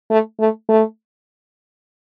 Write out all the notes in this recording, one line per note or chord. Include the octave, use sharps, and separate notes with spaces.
A3
A3
A3